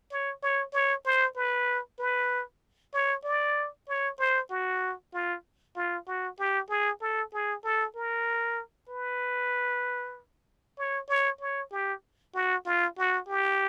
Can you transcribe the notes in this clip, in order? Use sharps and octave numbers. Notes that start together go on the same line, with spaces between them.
C#5
C#5
C#5
C5
B4
B4
C#5
D5
C#5
C5
F#4
F4
F4
F#4
G4
G#4
A4
G#4
A4
A#4
B4
C#5
C#5
C#5
G4
F#4
F4
F#4
G4